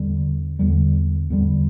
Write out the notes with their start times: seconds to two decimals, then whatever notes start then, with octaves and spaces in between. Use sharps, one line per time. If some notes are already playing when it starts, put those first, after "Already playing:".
Already playing: E2 D3 G3
0.59 E2 D3 G3
1.30 E2 D3 G3